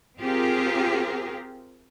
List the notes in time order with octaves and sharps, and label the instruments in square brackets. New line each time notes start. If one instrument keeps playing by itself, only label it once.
[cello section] C4 F4 G4 G#4 A#4